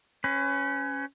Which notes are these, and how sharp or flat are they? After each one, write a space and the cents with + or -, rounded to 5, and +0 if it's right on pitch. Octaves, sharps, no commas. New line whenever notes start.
C#4 +0 B4 +35